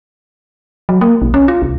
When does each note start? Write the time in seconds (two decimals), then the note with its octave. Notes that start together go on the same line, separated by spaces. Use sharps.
0.89 F#3
1.01 A#3
1.22 B1
1.34 C#4
1.48 F4
1.62 C2